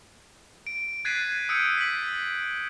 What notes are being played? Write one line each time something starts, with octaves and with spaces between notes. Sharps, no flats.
D7
F#6 G#6 A6 B6 C7 D#7
D#7
D#6 E6 G6 G#6 C#7 D7
B6 F#7